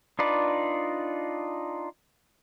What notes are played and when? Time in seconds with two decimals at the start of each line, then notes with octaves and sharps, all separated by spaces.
0.19 D4 D#4 F4 B4 D5